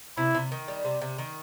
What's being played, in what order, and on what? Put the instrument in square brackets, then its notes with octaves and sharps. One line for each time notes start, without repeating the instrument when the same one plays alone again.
[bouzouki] C3 [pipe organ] E4
[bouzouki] C3
D#3
G3
C3
C3
D#3